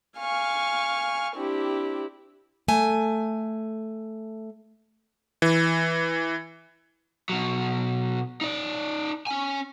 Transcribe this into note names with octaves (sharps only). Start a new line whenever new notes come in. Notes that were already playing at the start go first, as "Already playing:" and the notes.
F5 G#5 C#6 F6
C4 D4 E4 G4
A3 G#5
E3
B2 F#3
D#4 D5
C#4 G#5